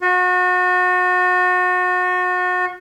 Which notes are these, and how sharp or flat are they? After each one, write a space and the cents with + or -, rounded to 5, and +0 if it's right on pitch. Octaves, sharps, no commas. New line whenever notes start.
F#4 -30